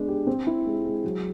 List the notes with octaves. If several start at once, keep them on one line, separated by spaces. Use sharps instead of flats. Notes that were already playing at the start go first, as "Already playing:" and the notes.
Already playing: G#3 B3 D4
G4
C4
E4
G#3
G#3
F#3